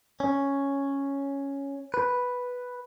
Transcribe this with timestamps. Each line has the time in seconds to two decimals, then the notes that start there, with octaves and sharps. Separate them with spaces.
0.20 C#4
1.94 B4